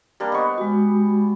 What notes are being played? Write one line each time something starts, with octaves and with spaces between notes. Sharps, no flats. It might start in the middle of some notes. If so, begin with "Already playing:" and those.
G3 A#3 D4
B3 C5 D#5 C#6
G#3 F#4